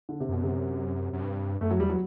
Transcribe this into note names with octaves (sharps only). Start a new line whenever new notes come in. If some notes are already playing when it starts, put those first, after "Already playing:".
D3
C3
F#2 B2
C3
F#2
G2
F#2 A3
F#3
E2 G3
F#3